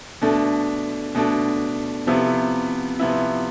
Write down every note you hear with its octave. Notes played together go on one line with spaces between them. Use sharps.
B2 A3 D4
B2 A3 D4
C3 F3 B3 E4
C3 F3 B3 E4